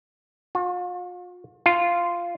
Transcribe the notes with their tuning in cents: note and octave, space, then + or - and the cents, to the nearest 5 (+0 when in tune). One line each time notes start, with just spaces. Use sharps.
F4 +45
F4 -5